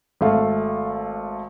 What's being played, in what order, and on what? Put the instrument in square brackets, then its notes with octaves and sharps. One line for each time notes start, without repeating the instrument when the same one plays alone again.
[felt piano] G#1 A3 F5